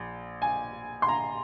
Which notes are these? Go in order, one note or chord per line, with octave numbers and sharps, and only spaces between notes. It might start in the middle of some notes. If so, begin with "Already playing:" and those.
Already playing: A#1
G#5
C6
A#5